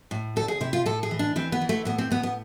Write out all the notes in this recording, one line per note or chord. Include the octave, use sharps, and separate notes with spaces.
A2
D2 A4
G#4
C3 E4
F4
A2 A4
G#4
E3
D4
E3 C4
B3
E3
A3
A2 B3
C4
A2 B3
B3